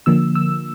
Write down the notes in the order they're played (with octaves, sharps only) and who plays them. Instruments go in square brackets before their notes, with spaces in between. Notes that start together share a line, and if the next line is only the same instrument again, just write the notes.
[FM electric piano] D3 F3 A#3 E6
E6